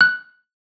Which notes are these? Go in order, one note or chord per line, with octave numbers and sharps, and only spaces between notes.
F#6